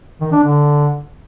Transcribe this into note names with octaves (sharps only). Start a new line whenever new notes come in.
D#3
D4
D3